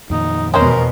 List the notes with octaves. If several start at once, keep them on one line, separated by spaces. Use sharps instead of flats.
F2 A#2 D#3 D#4
E2 B2 G#3 C#4 A#4 C5